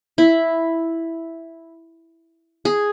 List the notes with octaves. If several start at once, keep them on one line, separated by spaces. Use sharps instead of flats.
E4
G#4